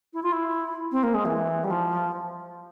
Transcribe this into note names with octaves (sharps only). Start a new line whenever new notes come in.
E4
F4
E4
C4
A#3
G#3
E3
G3
F3